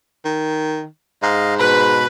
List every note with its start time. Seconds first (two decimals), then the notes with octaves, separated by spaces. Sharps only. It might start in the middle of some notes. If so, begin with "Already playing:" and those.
0.25 D#3
1.23 G#2 D#5 F5
1.59 B2 B4 B5